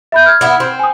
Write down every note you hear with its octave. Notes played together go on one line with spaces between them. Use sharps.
E5 B5 G6
F6 G#6
B3 E4
C4
G#5 D#6